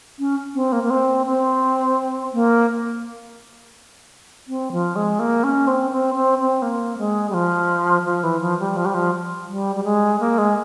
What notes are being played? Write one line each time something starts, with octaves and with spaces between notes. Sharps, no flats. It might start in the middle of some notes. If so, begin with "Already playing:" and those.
C#4
C4
A#3
A#3
C4
C4
A#3
C4
F3
G#3
A#3
C#4
C4
C4
C4
C4
A#3
G#3
G3
F3
F3
E3
F3
G3
F3
G3
F3
G3
G3
G#3
A#3
G#3